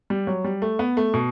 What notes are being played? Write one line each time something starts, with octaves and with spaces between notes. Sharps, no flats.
G3
F#3
G3
A3
B3
A3
B2